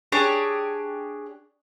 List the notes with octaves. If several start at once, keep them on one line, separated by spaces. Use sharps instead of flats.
D4 G4 G#4 C#5